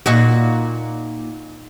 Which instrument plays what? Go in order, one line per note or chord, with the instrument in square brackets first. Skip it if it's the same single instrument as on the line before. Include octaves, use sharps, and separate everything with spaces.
[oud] A#2 D#4 F#4